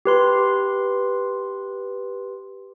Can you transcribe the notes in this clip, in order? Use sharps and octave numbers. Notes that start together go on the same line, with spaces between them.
G4 B4 C6